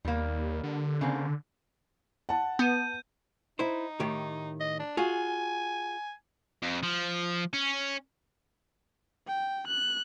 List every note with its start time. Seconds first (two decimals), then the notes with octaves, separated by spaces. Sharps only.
0.05 D#2 G3 A#3
0.64 D3
1.01 C#3 A#3 C4
2.29 F#5 A5
2.59 B3 G6 D#7
3.59 D#4 E4 C5
4.00 A2 D#3 G4
4.60 D#5
4.79 D4
4.97 F4 F#4 G#4 G#5
6.63 F2
6.83 F3
7.53 C#4
9.28 G5
9.67 F#6